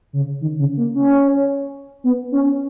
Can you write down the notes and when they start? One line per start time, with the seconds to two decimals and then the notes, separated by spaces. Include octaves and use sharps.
0.13 C#3
0.41 D#3
0.59 C#3
0.77 A#3
0.95 C#4
2.04 B3
2.32 C#4